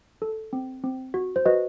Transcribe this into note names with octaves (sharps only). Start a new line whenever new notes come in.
A4
C4
C4
F#4
C5
F#4 B4 D#5